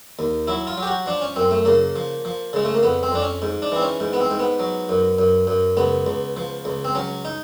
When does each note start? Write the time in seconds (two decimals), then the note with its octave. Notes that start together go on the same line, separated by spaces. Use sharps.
0.19 D#2
0.47 F#3 E4
0.67 F4
0.77 F#3
0.83 G4
0.87 F#4
1.06 F3 D4
1.21 C#4
1.36 F#2 C4
1.51 A3
1.65 C#3 A#3
1.96 F3
2.25 F3
2.53 C#3 G#3
2.65 A3
2.74 A#3
2.83 F2 B3
3.03 C4
3.12 F2 D4
3.22 C#4
3.42 G#2
3.62 D4
3.72 E3 C4
3.82 C#4
4.00 G#2
4.13 B3
4.21 C4
4.30 G#2
4.39 B3
4.60 F#3
4.89 F#2
5.18 F#2
5.47 F#2
5.77 C#2 B3
6.06 C#2
6.37 F3
6.65 C#2
6.85 C4
6.95 F#3 C#4
7.25 D#4